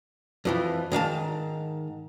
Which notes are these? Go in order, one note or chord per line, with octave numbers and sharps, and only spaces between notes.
F2 E3 F3
G#2 D#3 F5 A5